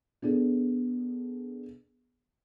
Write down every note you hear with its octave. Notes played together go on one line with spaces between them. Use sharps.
B3 D4 G#4 A4